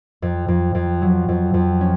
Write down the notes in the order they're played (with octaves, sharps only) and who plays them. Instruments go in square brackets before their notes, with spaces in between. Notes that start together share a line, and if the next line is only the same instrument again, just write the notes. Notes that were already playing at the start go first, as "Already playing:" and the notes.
[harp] F2
F2
F2
F#3
F2
F2
C#4